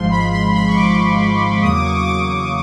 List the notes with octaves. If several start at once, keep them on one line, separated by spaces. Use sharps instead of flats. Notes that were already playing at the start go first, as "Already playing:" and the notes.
Already playing: G#1 G#2 F3 G#3 C6
B5
C6
B5
C#6
D6
E2 C#3 F#3 A#3 D#6
D6
C#6
D6
D6